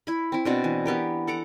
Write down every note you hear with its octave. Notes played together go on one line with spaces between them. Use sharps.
E4 B5
C4 E4
B2 C4 D4
E3
B3 G4 A#4
A4 F#5 A#5 D6